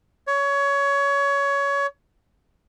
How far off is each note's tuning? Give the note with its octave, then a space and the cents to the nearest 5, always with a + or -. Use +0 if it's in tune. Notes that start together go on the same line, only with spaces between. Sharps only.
C#5 +20